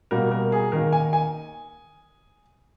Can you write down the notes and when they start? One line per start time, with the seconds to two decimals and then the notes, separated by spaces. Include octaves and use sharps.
0.11 B2 G3 A#3 A#4
0.31 A#4
0.52 G#4
0.72 D#3 A#3 A#4
0.93 G#5
1.13 G#5